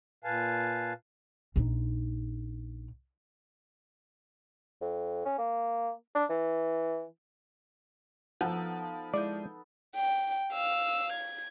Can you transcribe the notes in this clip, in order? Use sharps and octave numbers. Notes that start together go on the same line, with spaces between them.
A#2 B4 F5 G#5 A5
A#1 D#4
F2
C#4
A#3
D4
E3
F3 B3 D#4 A4 F#5
G#3 E4 D5 G6
G5
F5 E6
G#6